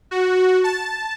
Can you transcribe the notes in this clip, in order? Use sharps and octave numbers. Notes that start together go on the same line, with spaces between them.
F#4
A5